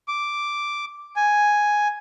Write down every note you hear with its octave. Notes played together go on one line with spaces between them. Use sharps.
D6
G#5